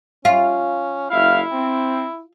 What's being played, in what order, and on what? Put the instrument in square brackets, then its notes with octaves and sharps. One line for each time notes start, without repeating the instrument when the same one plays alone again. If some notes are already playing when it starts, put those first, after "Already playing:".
[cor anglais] C#4 [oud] F4
[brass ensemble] F#1 E5 F5 [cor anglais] E4
[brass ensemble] C4